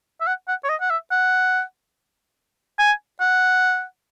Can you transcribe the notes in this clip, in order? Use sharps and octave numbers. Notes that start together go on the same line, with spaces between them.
E5
F#5
F#5
C#5
D#5
F#5
E5
F#5
G#5
F#5